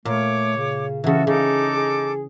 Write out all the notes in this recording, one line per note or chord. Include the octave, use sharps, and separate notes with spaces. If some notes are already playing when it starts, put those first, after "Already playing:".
A#2 A3 C#5 D6
C#3
C#3 E3 F#4 A4
C#3 D#4 G#4 A4 D6
G#4